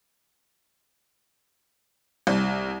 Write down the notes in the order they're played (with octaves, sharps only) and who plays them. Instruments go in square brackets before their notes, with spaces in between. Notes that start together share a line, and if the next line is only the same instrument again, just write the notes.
[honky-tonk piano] C2